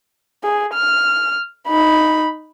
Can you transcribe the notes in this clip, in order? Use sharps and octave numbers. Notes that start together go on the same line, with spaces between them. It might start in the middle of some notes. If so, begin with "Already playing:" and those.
G#4
F6
D#4 B5